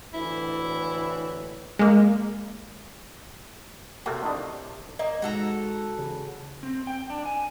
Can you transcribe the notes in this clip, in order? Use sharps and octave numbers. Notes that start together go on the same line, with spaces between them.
D2 A2 E3 E4
G#3 A#3
C3 A3 A#3 F#4
A2 D#3 D4
A#3 D#5
G#2 F#4 A4 A#5
C#3
C4
G5
D4
G#5